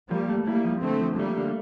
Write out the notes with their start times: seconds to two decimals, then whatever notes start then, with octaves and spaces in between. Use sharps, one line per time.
0.11 F3 G3 A#3
0.29 A3
0.47 G3 A#3 E4
0.65 F3
0.83 D3 A3 C4
1.01 F3
1.18 G3 A3 A#3
1.37 D3